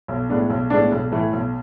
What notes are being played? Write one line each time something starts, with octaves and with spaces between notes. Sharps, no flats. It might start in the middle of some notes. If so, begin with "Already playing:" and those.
B1
A2 G#3 B3 D4
B1
A2 G#3 B3 D4
B1
A2 E3 A3
B1